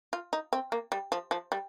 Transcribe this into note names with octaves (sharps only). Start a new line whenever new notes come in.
F4
D#4
C4
A#3
G3
F3
F3
G3